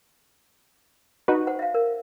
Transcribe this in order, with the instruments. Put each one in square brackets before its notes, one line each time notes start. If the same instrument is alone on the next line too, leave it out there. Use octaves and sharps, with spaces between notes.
[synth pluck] D#4 F#4 B4
[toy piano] C5 F#5
E5 F5
A#4